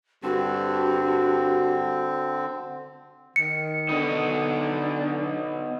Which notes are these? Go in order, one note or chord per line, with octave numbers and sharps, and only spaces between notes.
G2 D3 C4 F#4
D#3 C#7
D3 B3 D#4 D#5